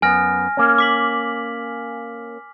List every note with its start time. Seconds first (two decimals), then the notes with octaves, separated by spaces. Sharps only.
0.02 F#2 B3 G#5 F6 A#6
0.57 A#3 C#4
0.78 D6 B6 F#7